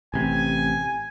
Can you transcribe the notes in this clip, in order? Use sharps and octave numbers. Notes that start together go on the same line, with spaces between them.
A1 C3 G#5